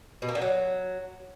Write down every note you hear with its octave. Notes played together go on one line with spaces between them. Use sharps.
B2
A#3
D3
F#3